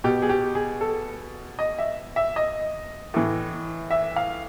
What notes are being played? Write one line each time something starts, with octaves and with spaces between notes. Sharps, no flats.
B2 G4
G#4
G4
G#4
A4
D#5
E5
E5
D#5
A2 E3
E5
F5